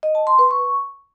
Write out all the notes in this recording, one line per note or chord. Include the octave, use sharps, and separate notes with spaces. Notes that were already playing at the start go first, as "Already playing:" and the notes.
D#5
A5
C6
B4
C#6